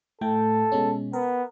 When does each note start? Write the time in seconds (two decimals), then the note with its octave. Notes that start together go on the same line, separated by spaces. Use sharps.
0.21 A2 A3 A4 G5
0.72 B2 G#3 C#4
1.13 B3 A#4